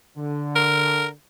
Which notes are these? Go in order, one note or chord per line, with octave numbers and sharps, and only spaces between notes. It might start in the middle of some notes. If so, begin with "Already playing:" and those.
D3
A#4